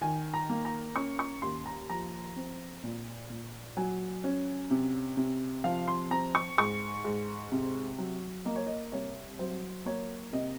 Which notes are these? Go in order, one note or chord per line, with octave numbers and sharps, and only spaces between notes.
D#3 G#5
A#5
A#3
A#5
C#4 C#6
C#6
D#2 C6
A#5
F3 A#5
C4
A#2
A#2
F#3 G#5
C#4
C3
C3
F3 F5
C6
C4 A#5
C#6
G#2 C#6
G#2
C3
F#3
A#3 D#5
C#5
D#5
C2 C#5
F#3 C5
A#3 C#5
C3 D#5